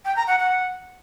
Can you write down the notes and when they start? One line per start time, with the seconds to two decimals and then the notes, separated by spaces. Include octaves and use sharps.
0.05 G5
0.16 A#5
0.27 F#5
0.38 F#5